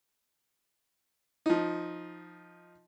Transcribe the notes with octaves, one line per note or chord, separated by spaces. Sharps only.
F3 D#4